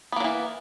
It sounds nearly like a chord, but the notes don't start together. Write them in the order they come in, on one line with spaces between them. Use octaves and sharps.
B3 A#3 F#3 E3